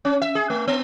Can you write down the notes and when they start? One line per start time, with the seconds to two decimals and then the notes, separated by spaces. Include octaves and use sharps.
0.05 C#4
0.22 E5
0.35 G#4
0.50 A3
0.67 B3